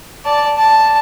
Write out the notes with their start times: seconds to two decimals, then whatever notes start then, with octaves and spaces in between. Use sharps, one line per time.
0.25 D5 A5
0.57 A5